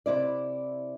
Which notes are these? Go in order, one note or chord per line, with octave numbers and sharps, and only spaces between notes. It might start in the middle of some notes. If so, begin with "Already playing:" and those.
C3 E4 D5